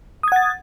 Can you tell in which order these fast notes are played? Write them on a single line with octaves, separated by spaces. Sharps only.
D#6 G#6 F#5 A6